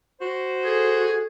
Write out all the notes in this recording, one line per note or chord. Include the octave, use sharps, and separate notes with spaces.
F#4 C5
G#4 A4